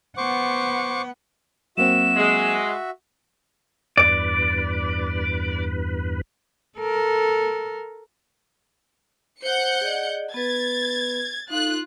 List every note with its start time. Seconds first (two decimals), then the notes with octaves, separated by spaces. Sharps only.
0.17 B3 C5 F#5 C#6 D6
1.78 F#3 A#3 C4 F#4 E5 E7
2.16 G#3
3.97 E2 G2 B4 D5
6.78 A4 A#4
9.42 C5 F#5 G6 C#7
9.81 G#4 D5 D#5
10.34 B3 B4 G#6 A6
11.50 D#4 F4 A4 F#6